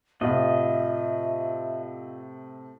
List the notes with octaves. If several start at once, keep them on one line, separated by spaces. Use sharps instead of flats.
A2 C3 F4 D#5 E5 F#5